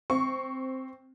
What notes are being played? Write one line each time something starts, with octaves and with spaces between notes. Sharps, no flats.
C4 C#6